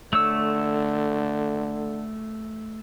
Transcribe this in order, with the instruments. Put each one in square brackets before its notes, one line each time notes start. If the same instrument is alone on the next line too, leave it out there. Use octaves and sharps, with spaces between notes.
[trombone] D3 [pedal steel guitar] A3 C#5 E6